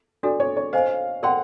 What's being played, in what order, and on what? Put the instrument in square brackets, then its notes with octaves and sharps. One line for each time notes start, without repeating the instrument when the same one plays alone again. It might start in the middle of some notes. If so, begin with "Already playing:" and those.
[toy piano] D4 F#4 A4 [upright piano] D5
[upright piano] C#5
C#5
[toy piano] C5 D#5 G#5 [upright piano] F5
[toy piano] A#4 D5 G5 C6 [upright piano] F#5